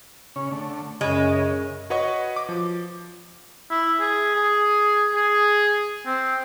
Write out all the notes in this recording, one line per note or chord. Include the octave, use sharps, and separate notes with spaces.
C#3 C#4
D3 A3
F#2 C#3 G#3
F#4 B4 C#5 D#5 F#5 C#6
D6
F3
E4
G#4
G#4
G#4
C4